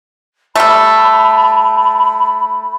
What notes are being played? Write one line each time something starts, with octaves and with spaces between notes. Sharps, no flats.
G3 A3 B5